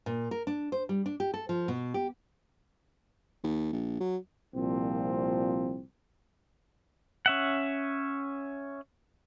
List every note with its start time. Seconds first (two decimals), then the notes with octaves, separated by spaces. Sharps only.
0.06 A#2
0.31 A#4
0.47 D4
0.72 C5
0.89 G3
1.06 D4
1.20 G4
1.34 A4
1.49 F3
1.68 B2
1.94 G4
3.44 D#2
3.73 A#1
4.00 F#3
4.54 C2 A#2 F3 C4
7.26 C#4 E5 F#5